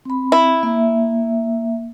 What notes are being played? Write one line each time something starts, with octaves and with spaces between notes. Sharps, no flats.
C4 B5
E4
A#3 E5